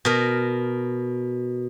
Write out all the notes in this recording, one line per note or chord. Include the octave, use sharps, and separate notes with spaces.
B2 A#4